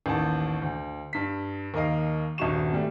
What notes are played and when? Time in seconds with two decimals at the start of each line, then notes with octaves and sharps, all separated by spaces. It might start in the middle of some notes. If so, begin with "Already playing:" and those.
0.06 A1 D#2 A5
0.62 D2
1.13 G2 B6
1.74 D#2 A#4 D#5 F5
2.38 D#1 G2 F#4 C#6 E7
2.73 G3 A3